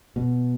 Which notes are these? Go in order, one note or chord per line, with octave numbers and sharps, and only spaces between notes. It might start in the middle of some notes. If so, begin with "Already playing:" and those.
B2